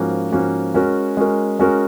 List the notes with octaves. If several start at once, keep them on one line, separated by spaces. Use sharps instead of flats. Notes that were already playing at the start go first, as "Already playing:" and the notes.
Already playing: G#2 F3 A#3 C#4 F#4
G#2 F3 A#3 C#4 F#4
G#3 C#4 F#4 A#4
G#3 C#4 F#4 A#4
G#3 C#4 F#4 A#4